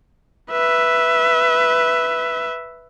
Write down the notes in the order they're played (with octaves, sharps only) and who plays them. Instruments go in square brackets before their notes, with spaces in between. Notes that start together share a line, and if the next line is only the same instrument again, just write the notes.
[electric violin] B4 E5